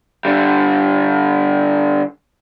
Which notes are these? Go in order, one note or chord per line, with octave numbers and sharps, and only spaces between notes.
D3 G3